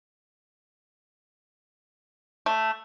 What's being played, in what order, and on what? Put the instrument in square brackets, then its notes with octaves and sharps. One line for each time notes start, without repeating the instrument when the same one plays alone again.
[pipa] A3